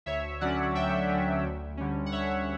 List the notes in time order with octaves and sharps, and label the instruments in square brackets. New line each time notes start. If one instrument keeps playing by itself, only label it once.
[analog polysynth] D2 C#5 E5
D3 F#3 C#4 D5 F#5
D2 E5 G5
D3 F#3 C#4
D2
D3 G3 C#4
F#5
D2 C#5 E5